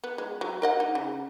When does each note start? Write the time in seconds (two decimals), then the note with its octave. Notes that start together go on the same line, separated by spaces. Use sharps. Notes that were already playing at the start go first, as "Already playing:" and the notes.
0.04 B3
0.18 G#3
0.41 F#3
0.62 A#4 D#5 F#5
0.80 D#4
0.95 C#3